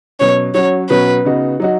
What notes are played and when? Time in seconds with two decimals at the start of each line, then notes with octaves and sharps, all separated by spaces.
0.19 B2 F#3 C#4 C#5
0.54 F#3 C#4 F#4 C#5
0.89 B2 F#3 C#4 F#4 B4
1.25 C#3 B3 D#4 F#4
1.60 F#3 D#4 F#4